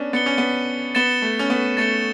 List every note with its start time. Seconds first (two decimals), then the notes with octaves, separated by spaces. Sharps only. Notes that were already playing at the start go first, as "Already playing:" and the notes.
Already playing: B3 C#4 D4
0.13 B3 A6 C#7 G7
0.26 C#4
0.38 B3
0.95 B3 A6 C#7 E7 G7
1.22 A3
1.39 C#4
1.50 B3
1.77 A3 A6 C#7 E7 G7